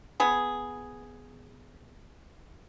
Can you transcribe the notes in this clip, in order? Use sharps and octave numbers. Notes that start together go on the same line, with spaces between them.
B3 G#4